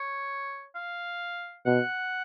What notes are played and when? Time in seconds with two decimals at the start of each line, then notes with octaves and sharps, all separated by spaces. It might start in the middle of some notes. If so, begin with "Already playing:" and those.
Already playing: C#5
0.75 F5
1.66 B2 F#5